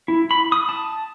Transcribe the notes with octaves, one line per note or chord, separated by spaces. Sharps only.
E4
B5
D#6
A5